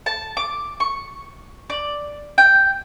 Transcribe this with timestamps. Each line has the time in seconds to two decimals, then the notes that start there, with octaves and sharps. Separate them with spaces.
0.06 A5
0.37 D6
0.80 C#6
1.70 D5
2.38 G5